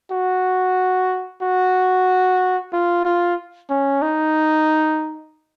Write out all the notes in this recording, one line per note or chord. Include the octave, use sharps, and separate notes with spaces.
F#4
F#4
F4
F4
C#4
D#4